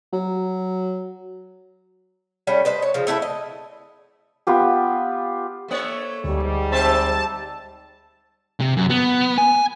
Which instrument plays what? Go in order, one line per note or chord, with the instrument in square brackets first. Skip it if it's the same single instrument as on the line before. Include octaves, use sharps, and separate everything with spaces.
[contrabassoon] F#3
[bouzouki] G3 A3 C#4
B4 C5 D#5
C#5
C#3 F3
A3 E4 F#4 A4
D#5
[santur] B3 F4 G4
[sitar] A3 A#3 C#5
[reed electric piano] D2 [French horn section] G#2 G3
[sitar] C4 C5 E5 [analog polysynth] A5
[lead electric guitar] C3
F#2
B3
G#5